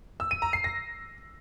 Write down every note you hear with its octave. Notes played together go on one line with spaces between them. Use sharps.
E6
D#7
A#5
C7
A#6